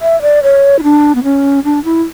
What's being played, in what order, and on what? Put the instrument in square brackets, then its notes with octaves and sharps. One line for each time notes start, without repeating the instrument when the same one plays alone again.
[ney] E5
D5
C#5
E4
D4
B3
C#4
D4
E4